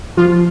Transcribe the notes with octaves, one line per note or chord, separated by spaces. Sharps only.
F3 F4